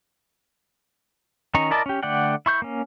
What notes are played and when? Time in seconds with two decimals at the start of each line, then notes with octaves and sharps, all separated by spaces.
1.54 D#3 C#4 D#5 A#5 C#6
1.71 E4 A#4 D5 D#5 A5
1.86 C#4 G4
2.03 D3 A3 D5 F#5 G5
2.46 E4 C#6 G6
2.62 A#3 C#4